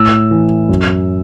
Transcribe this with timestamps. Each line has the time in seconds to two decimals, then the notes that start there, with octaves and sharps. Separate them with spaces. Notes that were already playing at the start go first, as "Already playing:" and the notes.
Already playing: A2 E6
0.31 E3
0.69 F#2